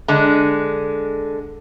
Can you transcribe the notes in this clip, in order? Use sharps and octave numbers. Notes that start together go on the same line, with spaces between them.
D3 G#3